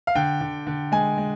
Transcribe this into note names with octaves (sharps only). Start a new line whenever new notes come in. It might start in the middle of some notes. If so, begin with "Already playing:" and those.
F5
D3 G5
D3
D3
G#3 G#5
G#3